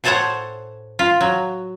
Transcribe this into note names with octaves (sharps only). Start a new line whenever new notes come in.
A2 G#4 A4 C5 C#5 F#5
F4
F#3